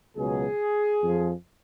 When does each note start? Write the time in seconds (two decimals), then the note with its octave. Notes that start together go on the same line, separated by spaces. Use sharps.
0.16 C#2 B2 F#3 G#4
1.02 F2 F3